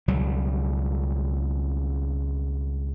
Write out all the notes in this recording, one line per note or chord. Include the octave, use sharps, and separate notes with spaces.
C#2 B2 F#3 G3